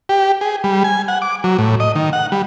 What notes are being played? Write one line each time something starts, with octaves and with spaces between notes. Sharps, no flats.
G4
G#4
G3
G#5
F#5
D6
F#3
A2
D#5
D#3
F#5
G3